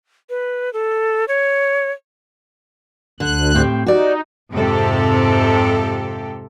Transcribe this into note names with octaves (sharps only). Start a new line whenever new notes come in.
B4
A4
C#5
D2 D3 F#6
A2 C4 G4
D#4 F#4 D5
F2 G#2 C3 G4 A4